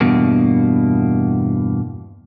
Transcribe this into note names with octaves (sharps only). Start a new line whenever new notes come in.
E2 G2 B2 A#3